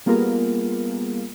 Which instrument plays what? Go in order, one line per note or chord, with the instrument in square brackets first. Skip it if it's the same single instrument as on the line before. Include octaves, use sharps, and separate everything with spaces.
[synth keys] G3 A#3 B3 F4 G#4 A#4